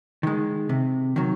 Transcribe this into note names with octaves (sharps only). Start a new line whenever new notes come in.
D#3 G#3
C3
D#3 F#3